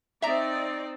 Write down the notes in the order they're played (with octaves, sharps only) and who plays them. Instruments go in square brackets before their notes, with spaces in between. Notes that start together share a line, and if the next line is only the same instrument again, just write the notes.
[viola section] C4 D#4 D5 [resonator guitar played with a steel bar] E5 A#5